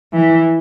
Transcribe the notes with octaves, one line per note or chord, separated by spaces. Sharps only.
E3